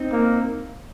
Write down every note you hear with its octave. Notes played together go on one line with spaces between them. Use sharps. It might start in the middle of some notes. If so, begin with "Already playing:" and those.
Already playing: C4 D#4
A#3